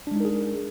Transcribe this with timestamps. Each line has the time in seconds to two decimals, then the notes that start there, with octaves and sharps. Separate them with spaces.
0.07 D4
0.11 G#3
0.16 D#4
0.20 A#4
0.25 G#4